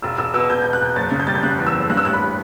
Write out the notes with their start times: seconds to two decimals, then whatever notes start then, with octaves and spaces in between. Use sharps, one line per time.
0.02 E1 E6
0.18 E1 E6
0.34 B2 E6
0.50 B2 G6
0.62 B2 G6
0.73 F#6
0.81 E1 G6
0.96 F#1 A6
1.12 C#3
1.20 G6
1.27 G3 A6
1.35 G6
1.43 C#3 F#6
1.59 E2
1.66 E6
1.74 F#1
1.90 G2 F#6
1.97 E6
2.05 A1 F#6
2.13 B5